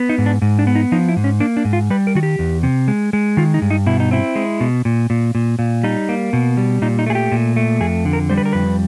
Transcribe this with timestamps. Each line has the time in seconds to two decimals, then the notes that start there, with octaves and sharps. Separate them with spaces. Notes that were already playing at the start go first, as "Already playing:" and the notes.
Already playing: B3
0.09 D#4
0.18 G#2
0.26 D4
0.42 G#2
0.59 D4
0.67 B3
0.75 D#4
0.92 F3 D#4
1.08 E4
1.16 G#2
1.24 C#4
1.40 A#3 D4
1.57 D4
1.65 G#2
1.73 F4
1.90 G3 B4
2.07 A#4
2.15 D#3 F#4
2.23 G4
2.39 E2
2.63 C3
2.88 G#3
3.13 G#3
3.37 D#3 F4
3.54 D#4
3.62 G2
3.71 D#4
3.86 B2 E4
4.00 D#4
4.11 C4 E4
4.36 G#3
4.60 B2
4.85 A#2
5.10 A#2
5.35 A#2
5.59 A#2
5.83 G3 D#4
6.09 A#3
6.33 B2
6.57 G3
6.82 A#2 D#4
6.99 D#4
7.06 A3 G#4
7.15 G4
7.32 A#2
7.56 A3
7.80 F2 G#4
8.05 D3
8.13 A#4
8.30 G3 C5
8.37 B4
8.45 A#4
8.53 F2 B4